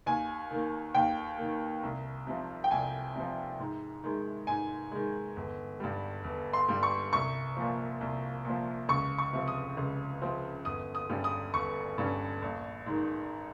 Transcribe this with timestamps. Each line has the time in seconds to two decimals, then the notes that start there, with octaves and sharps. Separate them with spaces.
0.06 D#2 G#5
0.51 D#3 A#3
0.94 D#2 G5
1.38 D#3 A#3
1.83 C2
2.27 C3 F3
2.64 G5
2.71 C2 G#5
3.16 C3 F3
3.59 G#2
4.04 D#3 G#3
4.47 G#2 G#5
4.92 D#3 G#3
5.36 G1
5.80 G2 G3
6.24 G1
6.53 C6
6.68 G2 G3
6.83 C#6
7.13 C2 C#6
7.57 A#2 F3
8.01 C2
8.45 A#2 F3
8.89 C#2 C#6
9.18 C#6
9.33 C3 F3 C4
9.48 D#6
9.77 C#2
10.22 C3 F3 C4
10.65 G1 D#6
10.95 D#6
11.09 G2 G3 C#4
11.24 D#6
11.54 G1 C#6
11.98 G2 G3 C#4
12.42 A#1
12.86 G#2 D#3